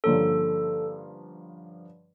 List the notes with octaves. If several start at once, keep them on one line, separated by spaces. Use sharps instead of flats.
G2 D3 F3 A#3 C#4 A4